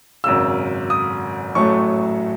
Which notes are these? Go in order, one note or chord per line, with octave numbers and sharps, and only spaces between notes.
G#1 F#2 C#3 E6
D#6
A1 A2 F#3 A3 C#6